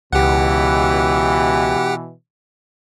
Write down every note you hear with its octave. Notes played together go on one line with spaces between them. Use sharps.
C#2 B2 E3 G4 F#5